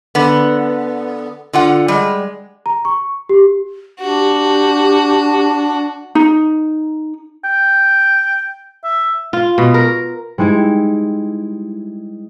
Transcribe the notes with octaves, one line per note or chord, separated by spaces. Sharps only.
D3 B3
D3 F4 F#5
G3 G#3
A#5
C#6
G4
D4 F#4 G4
D#4
G5
E5
F4
B2
A#4
G3 G#3 D#4 E4